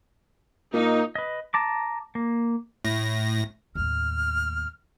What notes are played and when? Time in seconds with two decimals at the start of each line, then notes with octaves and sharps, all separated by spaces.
0.74 A#2 D#4
1.15 B4 D#5
1.54 A5 A#5 D6
2.15 A#3
2.85 A2 A#6
3.75 D#2 A2 F6